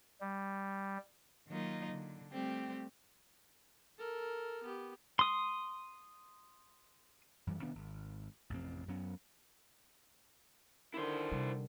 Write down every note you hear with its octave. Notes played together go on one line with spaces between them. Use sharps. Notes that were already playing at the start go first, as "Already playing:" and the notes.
G3
D#3 F#3 A#3 D#4 F4
D3
G3 A3 C4 G4
A4 A#4
B3 G4
C6 D#6
F#2 E3 G3
C3 D#3 B3 D4
G#1
A1 F2 C3 C4
F#2 F#3 B3 C#4
D3 D#3 E4 C5
C3 G3